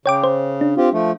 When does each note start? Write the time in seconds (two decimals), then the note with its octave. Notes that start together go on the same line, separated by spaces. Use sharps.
0.06 C#3 C#5 G5 D6
0.24 C5
0.61 D4
0.77 C4 F4 G4
0.93 F3 A3